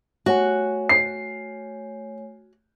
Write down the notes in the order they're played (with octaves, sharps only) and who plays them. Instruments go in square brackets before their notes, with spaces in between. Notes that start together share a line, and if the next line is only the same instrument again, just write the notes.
[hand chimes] A3 C#5 G#5 [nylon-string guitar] F#4
[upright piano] C7